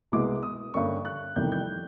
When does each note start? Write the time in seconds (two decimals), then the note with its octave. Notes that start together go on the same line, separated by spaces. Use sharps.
0.12 C2 B2 G#3 B3 D6
0.43 D#6
0.74 G2 D3 G3 A#3 C#4 C#6
1.05 F#6
1.36 F1 E2 C3 D#3 G3 G6
1.52 G6